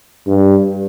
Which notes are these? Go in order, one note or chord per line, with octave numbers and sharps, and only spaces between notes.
G2